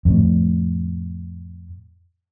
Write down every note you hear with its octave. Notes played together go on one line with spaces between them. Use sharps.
F2 A2